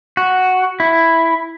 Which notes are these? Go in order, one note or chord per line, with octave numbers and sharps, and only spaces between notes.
F#4
E4